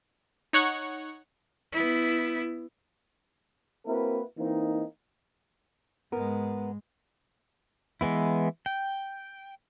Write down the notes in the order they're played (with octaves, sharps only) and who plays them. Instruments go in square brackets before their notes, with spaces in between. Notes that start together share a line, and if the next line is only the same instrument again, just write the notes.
[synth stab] D#4 C#5 F#5 C#6
[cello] B3 E4
[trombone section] A#3 C4 E4 F#4 A#4 B4
E3 A#3 C4 D#4
[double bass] G#2 G#3 [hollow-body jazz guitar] B3 A#4
[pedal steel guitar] E3 G#3 B3 E4
G5